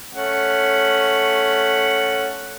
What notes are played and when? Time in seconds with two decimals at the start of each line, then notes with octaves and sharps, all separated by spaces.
0.14 A3 C#4 F#5